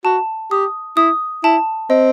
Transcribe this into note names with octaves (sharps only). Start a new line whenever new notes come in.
F#4 A5
G4 D#6
E4 D#6
E4 A5
C4 D#5